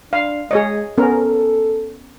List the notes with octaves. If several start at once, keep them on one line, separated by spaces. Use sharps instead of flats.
D4 F5
G#3 G#4 C#5 D#5
B3 C#4 A4 A#4